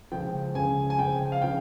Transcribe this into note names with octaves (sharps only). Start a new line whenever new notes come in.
C#2 C#3 F3 G5
C#2 C#3 F3 G#5
G#5
C#2 C#3 F3 G5
F5
C#3 F3 G5